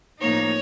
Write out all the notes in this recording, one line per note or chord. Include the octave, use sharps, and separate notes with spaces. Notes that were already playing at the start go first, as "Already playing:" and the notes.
A2 F3 A#3 D#4 C#5